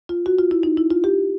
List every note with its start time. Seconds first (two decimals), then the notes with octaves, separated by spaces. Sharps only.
0.09 F4
0.26 F#4
0.39 F4
0.51 E4
0.63 D#4
0.77 E4
0.90 F4
1.04 G4